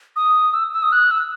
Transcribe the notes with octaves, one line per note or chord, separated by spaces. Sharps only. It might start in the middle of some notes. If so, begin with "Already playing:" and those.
D#6
E6
E6
D#6
F#6
E6